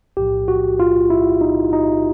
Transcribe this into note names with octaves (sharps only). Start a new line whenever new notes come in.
B1 A2 F3 G4
F#4
F4
E4
D#4
D#4